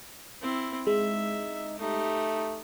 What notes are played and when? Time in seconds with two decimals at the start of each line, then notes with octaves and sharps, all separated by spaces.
0.42 C4 E4
0.87 G#3 D#4 E5
1.79 A3 D#4 G4